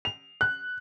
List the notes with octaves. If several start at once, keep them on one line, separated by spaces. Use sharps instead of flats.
F7
F#6